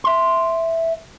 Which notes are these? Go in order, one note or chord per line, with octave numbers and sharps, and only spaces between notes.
E5 C6